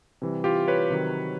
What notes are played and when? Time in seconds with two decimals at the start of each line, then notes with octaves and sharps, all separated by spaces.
0.22 C3 E3 G3
0.44 F4 G4
0.68 B4 C#5
0.90 C3 D#3 F#3